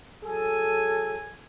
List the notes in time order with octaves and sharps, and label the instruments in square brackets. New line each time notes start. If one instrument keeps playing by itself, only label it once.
[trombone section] F#3 G#4 A4 [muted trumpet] G#5